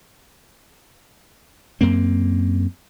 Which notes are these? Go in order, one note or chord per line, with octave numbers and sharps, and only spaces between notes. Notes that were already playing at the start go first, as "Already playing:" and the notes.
F#2 A#3 C4